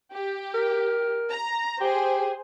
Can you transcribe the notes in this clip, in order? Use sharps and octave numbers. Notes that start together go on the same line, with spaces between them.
G4
A#4
A#5
G4 G#4 C5